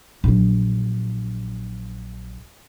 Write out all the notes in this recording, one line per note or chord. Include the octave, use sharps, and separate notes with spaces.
A#1 F#3